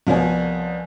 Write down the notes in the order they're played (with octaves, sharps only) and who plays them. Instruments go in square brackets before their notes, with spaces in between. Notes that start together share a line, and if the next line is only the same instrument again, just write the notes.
[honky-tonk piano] C2 F3 B3 C#5 G#5